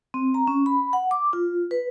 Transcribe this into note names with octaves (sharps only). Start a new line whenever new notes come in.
C4
A#5
C#4
B5
F#5
D6
F4
B4